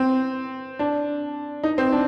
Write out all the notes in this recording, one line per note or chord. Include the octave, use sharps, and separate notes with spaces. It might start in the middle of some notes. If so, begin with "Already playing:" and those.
Already playing: C4
D4
D#4
C4
D4